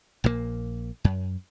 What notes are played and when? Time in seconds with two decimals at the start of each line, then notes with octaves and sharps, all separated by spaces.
0.24 A#1 A#2 C#3 A#3
1.04 F#2